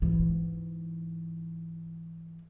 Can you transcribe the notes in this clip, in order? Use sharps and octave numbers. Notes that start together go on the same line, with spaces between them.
G#2 E3